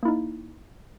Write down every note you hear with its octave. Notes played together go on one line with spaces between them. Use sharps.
A#3 D#4 E4